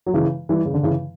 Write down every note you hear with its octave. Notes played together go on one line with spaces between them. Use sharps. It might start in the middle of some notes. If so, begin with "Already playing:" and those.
F#3
C#3 E3
E3 G3
C#3
D3
C#3 E3